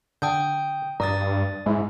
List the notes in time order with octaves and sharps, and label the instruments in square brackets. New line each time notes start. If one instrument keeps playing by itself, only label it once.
[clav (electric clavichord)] D3 A4 [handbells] G5 D#6 G6
[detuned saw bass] G2 [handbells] D5 D#6 A6 [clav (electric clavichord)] A#5
[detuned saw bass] G#2 [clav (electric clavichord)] G#3 E4